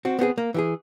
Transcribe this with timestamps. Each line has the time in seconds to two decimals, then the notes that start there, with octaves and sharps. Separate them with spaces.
0.05 C4 F#4
0.19 B3 C4 F#4 G#4
0.38 A#3
0.54 E3 G4 G#4